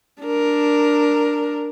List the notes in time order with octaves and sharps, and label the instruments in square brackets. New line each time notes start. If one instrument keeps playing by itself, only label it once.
[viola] D4 A#4